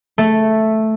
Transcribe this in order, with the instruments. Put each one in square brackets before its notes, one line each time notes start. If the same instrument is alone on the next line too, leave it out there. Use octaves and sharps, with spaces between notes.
[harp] A3